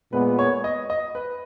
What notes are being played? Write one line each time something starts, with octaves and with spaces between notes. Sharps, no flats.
A#2 G#3 B3 B4
C#5
D#5
D#5
B4